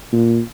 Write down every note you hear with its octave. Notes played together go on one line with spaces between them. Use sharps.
A#2